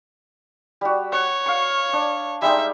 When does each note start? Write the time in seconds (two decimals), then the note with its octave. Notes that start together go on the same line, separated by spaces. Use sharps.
0.81 G3 F#4
1.12 C#5 F#5
1.46 F5 C#6
1.93 D4
2.42 G3 G#3 D#4 E5